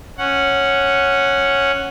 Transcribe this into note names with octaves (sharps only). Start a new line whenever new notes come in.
C#4 F#5